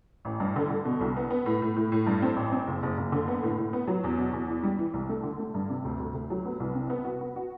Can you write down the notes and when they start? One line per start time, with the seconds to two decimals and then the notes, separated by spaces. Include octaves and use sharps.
0.25 A1
0.40 G2
0.56 D3
0.70 D3
0.85 B2
1.00 C2
1.17 B3
1.30 B3
1.46 A2
1.62 A2
1.76 A2
1.92 A2
2.07 G2
2.22 C4
2.36 A1
2.52 C4
2.67 F#1
2.83 F#1
2.98 F#1
3.12 D3
3.28 B3
3.43 A2
3.58 A2
3.73 B3
3.87 F#3
4.04 E2
4.18 B2
4.33 E2
4.48 E3
4.63 G3
4.78 E3
4.93 C2
5.09 A3
5.23 D3
5.39 A3
5.54 G2
5.70 C3
5.84 D2
5.99 D2
6.14 D2
6.30 F#3
6.45 B3
6.60 C2
6.75 C3
6.90 B3
7.05 F#4
7.21 B3
7.36 F#4